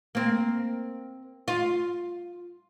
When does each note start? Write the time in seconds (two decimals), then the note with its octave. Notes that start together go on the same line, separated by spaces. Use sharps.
0.15 A#3 C4
1.48 F4